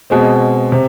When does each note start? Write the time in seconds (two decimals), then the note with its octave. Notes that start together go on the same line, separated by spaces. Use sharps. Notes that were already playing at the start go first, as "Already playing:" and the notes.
0.10 B2 G#3 C4
0.72 C3